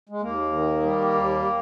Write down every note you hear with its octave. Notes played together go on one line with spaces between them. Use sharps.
G#3
D#2 A#3
D#3
G3
D#2